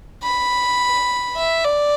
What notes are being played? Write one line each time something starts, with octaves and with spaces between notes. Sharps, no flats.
B5
E5
D5